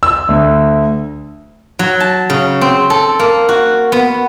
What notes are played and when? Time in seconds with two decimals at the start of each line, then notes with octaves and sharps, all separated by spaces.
0.03 E6
0.28 D2
1.79 F#3
2.00 A5
2.30 C#3
2.61 C4
2.90 A4
3.19 A#3
3.49 F#4
3.92 B3